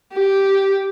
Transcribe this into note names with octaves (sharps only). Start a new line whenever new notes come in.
G4